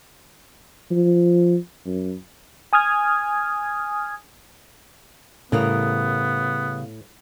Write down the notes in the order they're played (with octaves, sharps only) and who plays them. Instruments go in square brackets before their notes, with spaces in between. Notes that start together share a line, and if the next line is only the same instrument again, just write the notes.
[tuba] F3
F#2
[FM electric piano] G#5 D#6 F6 G#6
[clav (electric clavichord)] A2 [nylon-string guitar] C#3 G3 A#4 [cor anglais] B3